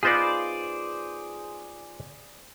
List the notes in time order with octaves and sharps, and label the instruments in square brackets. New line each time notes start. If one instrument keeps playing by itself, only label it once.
[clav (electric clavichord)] B3 D#4 F4 [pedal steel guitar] G#4 C5 D5